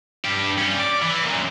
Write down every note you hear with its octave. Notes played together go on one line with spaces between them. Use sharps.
G2 G4
G3 C#4
D5
E3
F#2 A#2